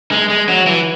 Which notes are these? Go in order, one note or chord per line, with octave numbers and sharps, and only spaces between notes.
G#3
G#3
F#3
E3